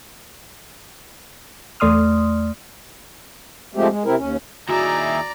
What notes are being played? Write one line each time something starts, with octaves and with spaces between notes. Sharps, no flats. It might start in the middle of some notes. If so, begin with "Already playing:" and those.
E2 A3 D5 C6 D#6 F6
F3 G#3 A3 C4 G4
G#3
C3 C4 E4 A#4
D#2 C#4
D#2 D#4 E4 F#4 G#4 D5 E5 A#5